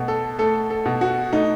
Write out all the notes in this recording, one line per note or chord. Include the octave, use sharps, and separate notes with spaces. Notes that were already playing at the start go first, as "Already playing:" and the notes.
Already playing: B2 A3
A4
A3 A4
A4
B2
F#4
A3 D#4